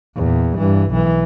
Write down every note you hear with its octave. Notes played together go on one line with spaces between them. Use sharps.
E2 A#2
G2 E3
B1 E3